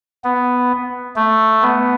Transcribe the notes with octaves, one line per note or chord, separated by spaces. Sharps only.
B3
A3
B3